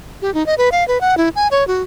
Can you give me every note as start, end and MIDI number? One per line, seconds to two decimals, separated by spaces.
0.22 0.33 67
0.34 0.46 63
0.46 0.55 75
0.58 0.69 71
0.72 0.86 77
0.88 1.01 71
1.01 1.17 78
1.17 1.29 64
1.35 1.48 80
1.51 1.66 73
1.67 1.83 66